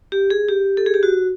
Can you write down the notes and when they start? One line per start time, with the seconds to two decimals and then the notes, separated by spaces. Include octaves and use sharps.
0.12 G4
0.30 G#4
0.48 G4
0.77 A4
0.86 G#4
0.94 G4
1.03 F#4